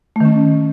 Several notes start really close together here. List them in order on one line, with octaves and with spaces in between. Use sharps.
A3 D#3 C#4